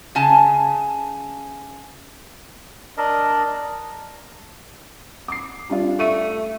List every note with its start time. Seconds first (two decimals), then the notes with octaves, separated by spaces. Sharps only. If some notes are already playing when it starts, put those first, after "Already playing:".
0.15 C#3 G#5 A5
2.97 D4 A#4 D#5
5.28 D6 C7
5.70 G3 D4 F4
5.99 A3 C#6 D#7